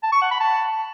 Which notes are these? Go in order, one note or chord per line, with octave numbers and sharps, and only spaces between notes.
A5
C#6
F#5
B5
A5